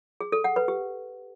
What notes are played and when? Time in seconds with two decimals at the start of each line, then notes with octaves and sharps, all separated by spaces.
0.21 G#4
0.32 A4
0.44 F#5
0.56 B4
0.68 G4